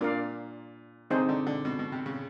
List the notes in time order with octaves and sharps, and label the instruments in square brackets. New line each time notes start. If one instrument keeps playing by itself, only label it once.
[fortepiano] A#2 [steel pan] D4 F4 A#4 D5 F5
[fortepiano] D3 [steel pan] C4 D#4 G#4 C5
[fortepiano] D3
D3
B2
B2
C3
C#3